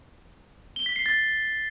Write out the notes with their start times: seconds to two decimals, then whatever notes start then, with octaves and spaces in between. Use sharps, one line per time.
0.76 G7
0.86 B6
0.96 C7
1.06 A6